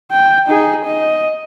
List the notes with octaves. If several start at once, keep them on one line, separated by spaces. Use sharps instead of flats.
G5
D#4 G#4
D#5